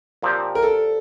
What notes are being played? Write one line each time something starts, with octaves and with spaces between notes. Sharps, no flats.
A#2 F3 C4 G4
A#4
A4